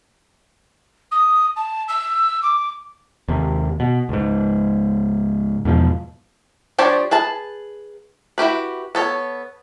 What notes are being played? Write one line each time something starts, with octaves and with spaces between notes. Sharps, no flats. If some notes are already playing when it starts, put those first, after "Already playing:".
D#6
A5
E6
D6
D#2 C3
B2
C#2 G#2
E2 G#2 B2 F3
F3 D4 G4 C#5 D5
G#4 B4 A5
E4 F#4 G4 B4
B3 A4 C#5